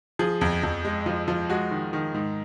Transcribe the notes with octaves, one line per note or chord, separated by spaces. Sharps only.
F3 G#4
F2
F2
G#3
F3
F3
G#3 F#4
D#3
D#3
G#2